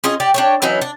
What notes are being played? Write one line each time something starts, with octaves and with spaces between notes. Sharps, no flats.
C#4 F4 G#4 D#5
G4 D5
D4 G4 C#5
E3 F#3 C#4 D#4
D4